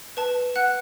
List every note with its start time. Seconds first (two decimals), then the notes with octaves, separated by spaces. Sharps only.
0.17 B4 A5
0.56 F#5 F#6